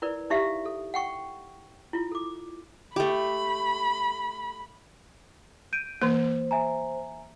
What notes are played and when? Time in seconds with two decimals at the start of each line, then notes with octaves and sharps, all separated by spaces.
0.02 E4 A#4 B4 D5
0.30 D#4 E4 G4 E5 F5
0.65 A4
0.94 F#5 G5 C#6
1.93 E4 F4
2.11 A4 D6
2.96 A3 G4 B5
5.73 G6 D7 D#7
6.02 E3 A#3 C5
6.51 E5 G#5 A#5